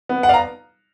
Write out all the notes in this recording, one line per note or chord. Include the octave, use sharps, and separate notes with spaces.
B3
F#5
D5 F5
A#5